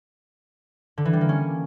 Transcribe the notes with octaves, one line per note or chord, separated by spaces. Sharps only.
D3
E3
G3
A#3
C#4